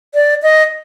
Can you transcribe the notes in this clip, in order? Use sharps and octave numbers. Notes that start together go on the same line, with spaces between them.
D5
D#5